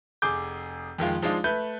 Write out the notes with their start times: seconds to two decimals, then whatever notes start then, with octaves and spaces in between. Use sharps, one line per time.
0.22 F1 G#4 D6 G6
0.98 F2 D#3 G#3 F4
1.22 F3 G#3 D4 D#4 F4
1.44 A3 B4 G6